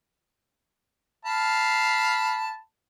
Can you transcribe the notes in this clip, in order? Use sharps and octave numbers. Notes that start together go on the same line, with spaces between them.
F5 A5 B5